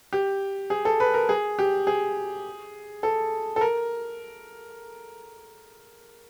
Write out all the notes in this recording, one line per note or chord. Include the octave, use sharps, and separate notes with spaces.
G4
G#4
A4
B4
A#4
G#4
G4
G#4
A4
A4
A#4